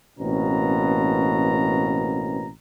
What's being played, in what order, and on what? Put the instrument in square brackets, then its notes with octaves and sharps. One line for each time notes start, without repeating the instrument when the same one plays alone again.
[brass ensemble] A1 B2 A#3 C4 C#4 A#5